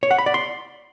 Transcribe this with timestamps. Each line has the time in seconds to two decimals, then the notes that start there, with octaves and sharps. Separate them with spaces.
0.03 C#5
0.11 F#5
0.18 B5
0.26 D5
0.34 C6